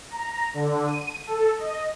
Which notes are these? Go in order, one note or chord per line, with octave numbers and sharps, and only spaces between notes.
A#5
D3
D#7
A4
D#5